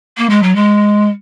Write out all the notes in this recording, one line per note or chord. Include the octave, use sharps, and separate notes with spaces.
A#3
G#3
F#3
G#3